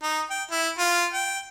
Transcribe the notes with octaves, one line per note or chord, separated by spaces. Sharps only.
D#4
G5
E4
F4
G5